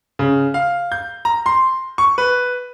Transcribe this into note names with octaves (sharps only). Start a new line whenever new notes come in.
C#3
F5
G6
A#5
C6
C#6
B4